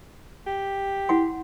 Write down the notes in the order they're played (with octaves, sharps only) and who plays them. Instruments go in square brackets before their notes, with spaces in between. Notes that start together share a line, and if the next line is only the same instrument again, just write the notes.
[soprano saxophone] G4
[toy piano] E4 F#5 C6